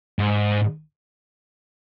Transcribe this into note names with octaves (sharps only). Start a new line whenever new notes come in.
G#2